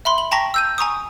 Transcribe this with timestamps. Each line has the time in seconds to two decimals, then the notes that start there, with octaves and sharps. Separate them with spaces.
0.05 E5 B5 C6
0.18 F#7
0.31 G5 A5 A#5 C#6 A#6 B6
0.54 E6 G6 D#7
0.78 G#5 A#5 C#6 D#6